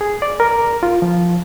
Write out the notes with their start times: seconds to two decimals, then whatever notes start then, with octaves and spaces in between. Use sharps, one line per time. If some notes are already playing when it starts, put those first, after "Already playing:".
0.01 G#4
0.22 D5
0.40 A#4
0.83 F4
1.02 F3